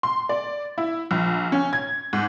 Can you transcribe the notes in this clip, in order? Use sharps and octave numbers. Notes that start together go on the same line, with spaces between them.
C6
D5
E4
A#1
C#4
G#6
G#2